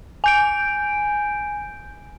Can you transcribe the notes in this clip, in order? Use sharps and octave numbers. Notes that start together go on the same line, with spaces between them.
G#5 G6 D7